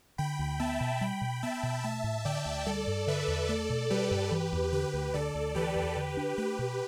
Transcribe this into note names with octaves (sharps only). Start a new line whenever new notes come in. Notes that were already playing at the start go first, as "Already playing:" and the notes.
D3 G5 B5
D2
B3 E5 A5
B2
G3 G5 B5
B2
B3 E5 A5
B2
A3 E5 A5
A2
D3 D5 G5
D2
G3 A4 D5
G2
D3 B4 E5
E2
A3 A4 D5
B2
G3 G4 B4
G2
E3
E2
D3 G4 B4
D2
D3 A4 D5
D2
E3 G4 B4
E2
D3
D4
A3 G4 B4
B2